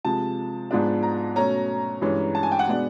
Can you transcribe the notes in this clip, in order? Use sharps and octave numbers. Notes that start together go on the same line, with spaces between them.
C3 F3 G#3 A5
G#2 F3 G#3 B3 D4
A#5
B2 F#3 A3 C#4 A#5
G2 E3 G#3 C#4
A5
G#5
G5
F#5
B2 G#3 B3 D4